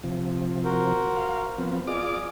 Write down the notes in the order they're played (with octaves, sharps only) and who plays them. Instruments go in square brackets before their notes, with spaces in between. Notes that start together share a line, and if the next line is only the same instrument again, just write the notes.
[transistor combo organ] C3 F3
[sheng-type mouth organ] F#4 A#4 C5
[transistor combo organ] F5
F3 B3 C4
[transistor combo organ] F4 D5 D6 [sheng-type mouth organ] G#4 D#5 F6